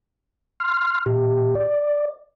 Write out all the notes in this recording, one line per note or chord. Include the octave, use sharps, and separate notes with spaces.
C6 F6
A#2 G4
D5